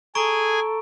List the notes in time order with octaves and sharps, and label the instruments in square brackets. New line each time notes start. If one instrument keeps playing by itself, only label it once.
[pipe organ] G#4 G#5 [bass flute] A4 [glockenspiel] A#5 C#6 D7